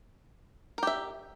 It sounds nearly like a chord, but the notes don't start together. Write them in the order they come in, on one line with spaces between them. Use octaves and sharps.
A#4 G4 E5